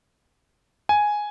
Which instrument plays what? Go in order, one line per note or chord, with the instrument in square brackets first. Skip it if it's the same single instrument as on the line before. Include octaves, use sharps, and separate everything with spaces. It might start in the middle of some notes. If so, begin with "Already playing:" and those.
[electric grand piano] G#5